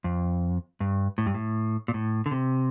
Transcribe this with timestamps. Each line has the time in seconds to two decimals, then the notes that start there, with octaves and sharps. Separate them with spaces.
0.04 F2
0.80 G2
1.18 A2
1.26 G2
1.34 A2
1.88 A#2
1.94 A2
2.26 D3
2.31 C3